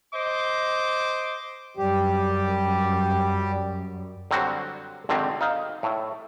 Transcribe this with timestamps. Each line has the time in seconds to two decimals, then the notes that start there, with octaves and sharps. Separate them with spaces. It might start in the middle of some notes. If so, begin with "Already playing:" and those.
0.15 C5 D#5 D6
1.77 F#2 G3 G4
4.31 D3 F#3 G3 C4 F#4
5.09 G#1 D3 D#3 C4
5.41 D#4 F5
5.83 A2 E5